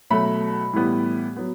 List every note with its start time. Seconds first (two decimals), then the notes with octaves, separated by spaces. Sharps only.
0.10 B2 F#3 A3 B5
0.73 A2 E3 G3 B3
1.36 F#3 B3